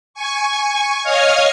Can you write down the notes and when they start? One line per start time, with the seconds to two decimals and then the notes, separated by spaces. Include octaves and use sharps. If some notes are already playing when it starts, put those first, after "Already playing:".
0.14 G#5 C#6
1.03 C#5 D#5 F5 D#6 F6 G#6